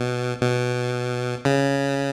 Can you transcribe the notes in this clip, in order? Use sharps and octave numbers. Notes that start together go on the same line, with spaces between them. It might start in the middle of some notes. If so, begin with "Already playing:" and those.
Already playing: B2
B2
C#3